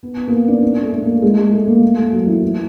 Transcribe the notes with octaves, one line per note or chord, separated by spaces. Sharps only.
B3
B3
A#3
B3
D4
D4
A3
A3
A#3
A3
G#3
G#3
A3
A#3
A#3
A3
F#3
E3
E3